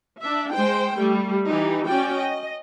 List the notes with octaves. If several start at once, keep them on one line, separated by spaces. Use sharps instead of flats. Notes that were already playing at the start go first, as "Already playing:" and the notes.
D4 E5
G#3 C5 G5
G3 A3
E3 D#4 G4
C#4 F#4 D5 G5
D#5